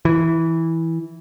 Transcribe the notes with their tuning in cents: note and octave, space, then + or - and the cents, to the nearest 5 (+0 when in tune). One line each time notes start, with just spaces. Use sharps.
E3 -10